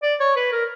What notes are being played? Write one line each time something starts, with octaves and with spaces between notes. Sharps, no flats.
D5
C#5
B4
A#4